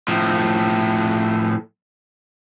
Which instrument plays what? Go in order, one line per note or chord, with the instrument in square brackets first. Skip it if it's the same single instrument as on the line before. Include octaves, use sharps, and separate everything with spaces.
[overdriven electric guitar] A2 F3